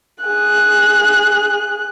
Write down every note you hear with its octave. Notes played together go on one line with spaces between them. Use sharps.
G#4 F#6